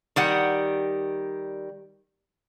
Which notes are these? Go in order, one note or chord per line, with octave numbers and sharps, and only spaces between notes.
D#3 G3 F#5